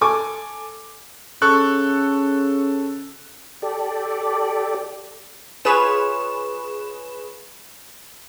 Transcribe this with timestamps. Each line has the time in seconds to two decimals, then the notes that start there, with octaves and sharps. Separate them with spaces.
0.01 A4 G#5 D6
1.42 C#3 A4 C#6 F#6
3.62 G4 A4 D5
5.65 F4 G#4 B4 C#5 E7